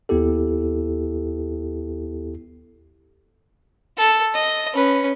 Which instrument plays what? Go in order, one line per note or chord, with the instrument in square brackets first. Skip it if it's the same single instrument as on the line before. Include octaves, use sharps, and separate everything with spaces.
[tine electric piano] D#2 B3 E4 G4 A4
[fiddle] A4
D#5
C#4 B4